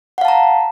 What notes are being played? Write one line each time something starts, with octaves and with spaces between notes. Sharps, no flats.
F5 F#5 A5 A#5